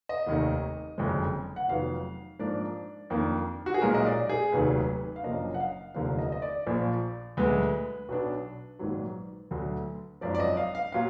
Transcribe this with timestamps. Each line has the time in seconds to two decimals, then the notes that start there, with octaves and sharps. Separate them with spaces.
0.09 D#5
0.27 F1 D#2 D#3
0.98 F#1 F2 D3 F3 G#3
1.56 F#5
1.68 F1 F2 D#3 F#3 B3 F5
2.39 G#2 F3 A#3 D4 D5
3.10 F2 D#3 A#3 D4
3.66 F#4
3.74 G#4
3.81 B1 A#2 G#3 A#4
3.94 D#5
4.06 D5
4.29 G#4
4.52 F1 D#2 D#3 F#3 B4
5.16 F5
5.23 F#1 F#2 F3 A#3 D4 D#5
5.54 F#5
5.60 F5
5.94 F1 D#2 D3 F3 A#3 F5
6.18 D#5
6.32 D#5
6.42 D5
6.67 A#1 A#2 F3
7.37 D2 D3 G#3 B4
8.08 B1 B2 F#3 B3 D4
8.79 A#1 G#2 D#3 F#3
9.51 D2 D3 F#3
10.21 G#1 F#2 F3 D5
10.35 D5
10.40 D#5
10.57 F5
10.75 F5
10.92 A#2 F#3 F5